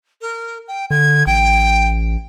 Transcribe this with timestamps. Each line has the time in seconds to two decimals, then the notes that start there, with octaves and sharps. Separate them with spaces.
0.21 A#4
0.68 G5
0.90 D3 G#6
1.27 A1 G5